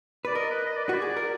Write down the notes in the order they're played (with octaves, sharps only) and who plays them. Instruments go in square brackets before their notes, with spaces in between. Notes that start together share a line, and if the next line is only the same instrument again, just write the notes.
[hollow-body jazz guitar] B4 [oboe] D5
[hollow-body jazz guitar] A#4 [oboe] D#5
[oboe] B4
D#5
D5
[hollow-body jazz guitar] F#4 [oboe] B4
[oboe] D5
[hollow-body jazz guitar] G#4
A#4